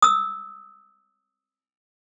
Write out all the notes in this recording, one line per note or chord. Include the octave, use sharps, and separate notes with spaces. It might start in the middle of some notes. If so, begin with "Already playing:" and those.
D#6 E6